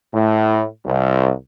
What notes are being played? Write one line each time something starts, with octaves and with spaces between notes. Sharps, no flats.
A2
C2